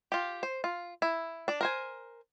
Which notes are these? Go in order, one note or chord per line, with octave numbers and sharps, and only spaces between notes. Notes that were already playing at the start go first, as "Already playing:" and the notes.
F4 G4
C5
F4
E4
D4 D5
A#4 C5 G#5